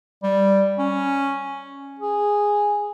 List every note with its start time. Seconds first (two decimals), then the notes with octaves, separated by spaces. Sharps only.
0.23 G3
0.79 C#4
1.99 G#4